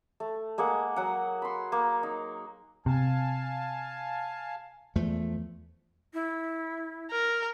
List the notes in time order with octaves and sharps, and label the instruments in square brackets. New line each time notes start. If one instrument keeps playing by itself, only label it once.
[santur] A3
G#3 A#3 G#4 F#5
F#3 F#5
B5 C6
A#3
D#4
[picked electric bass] C3 [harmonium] F5 G#5 A5
[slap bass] E2 F3 A3
[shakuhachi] E4
[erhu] A#4